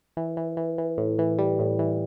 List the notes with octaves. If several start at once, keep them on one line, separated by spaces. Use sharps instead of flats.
E3
E3
E3
E3
A2
E3
G3
A2
E3